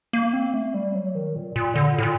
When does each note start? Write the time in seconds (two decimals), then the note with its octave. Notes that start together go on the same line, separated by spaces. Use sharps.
0.13 A#3
0.33 C4
0.54 A3
0.74 G3
0.95 F#3
1.15 D#3
1.36 A#2
1.56 A#2
1.76 D3
1.98 A2
2.03 A#2